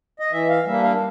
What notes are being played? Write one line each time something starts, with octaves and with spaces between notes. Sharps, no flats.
D#5
E3 E5
F5
G3 A#3 D4 E5
F5